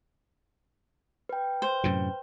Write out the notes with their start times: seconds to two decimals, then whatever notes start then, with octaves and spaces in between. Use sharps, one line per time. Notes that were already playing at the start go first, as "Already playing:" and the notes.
1.29 B4 G5
1.62 C5
1.84 F#2 A2 C3